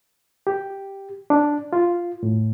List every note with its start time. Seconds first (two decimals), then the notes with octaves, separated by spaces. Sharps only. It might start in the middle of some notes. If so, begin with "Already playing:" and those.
0.47 G4
1.30 D4
1.73 F4
2.23 A2